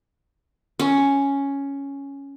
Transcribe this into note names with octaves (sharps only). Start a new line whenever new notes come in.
C#4